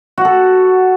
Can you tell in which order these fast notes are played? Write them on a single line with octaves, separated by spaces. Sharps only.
F#4 F#5 A4